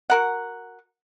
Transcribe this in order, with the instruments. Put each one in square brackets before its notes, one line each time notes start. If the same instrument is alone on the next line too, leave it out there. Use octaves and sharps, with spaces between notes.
[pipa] F#4 A#4 F#5